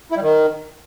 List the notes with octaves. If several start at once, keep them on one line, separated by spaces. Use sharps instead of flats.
E4
G3
D#3